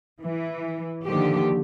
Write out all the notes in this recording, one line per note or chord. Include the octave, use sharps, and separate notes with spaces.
E3
D3 D#3 F3 A#3 G4